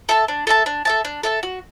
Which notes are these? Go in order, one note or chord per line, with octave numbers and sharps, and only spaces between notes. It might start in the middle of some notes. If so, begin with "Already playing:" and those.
A4 E5 A5
D4
A4 E5 A5
D4
A4 E5 A5
D4
A4 E5 A5
F#4